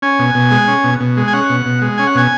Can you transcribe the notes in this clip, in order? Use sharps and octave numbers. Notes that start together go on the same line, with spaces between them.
C#4 G#5
B2
B2
G#3
C#4
B2
B2
G#3
G#5
C#4 F#5
B2
B2
G#3
C#4 G#5
F#5
B2 G#5